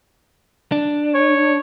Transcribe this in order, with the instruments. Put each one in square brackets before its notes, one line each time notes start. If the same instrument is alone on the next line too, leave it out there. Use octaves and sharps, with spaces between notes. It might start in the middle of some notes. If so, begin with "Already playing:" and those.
[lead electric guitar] D4
[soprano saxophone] C#5